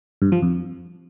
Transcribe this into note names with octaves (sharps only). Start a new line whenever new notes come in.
G2
F3
F2